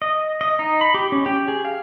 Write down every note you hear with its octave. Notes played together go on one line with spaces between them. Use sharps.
D#5
D#5
D#4
B5
G4
C#4
G4
G#4
F5